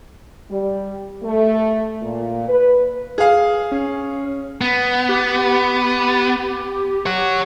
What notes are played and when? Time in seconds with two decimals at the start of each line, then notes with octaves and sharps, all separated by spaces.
0.50 G3
1.23 A3
2.01 A#2
2.48 B4
3.18 G#4 F5
3.72 C#4
4.61 B3
5.09 G4
7.06 C#5 F#5